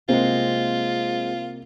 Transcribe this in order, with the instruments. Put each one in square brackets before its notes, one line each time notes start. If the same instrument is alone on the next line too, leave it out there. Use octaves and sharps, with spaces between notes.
[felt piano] C2 A#3 [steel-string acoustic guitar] G#3 C4 [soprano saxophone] F4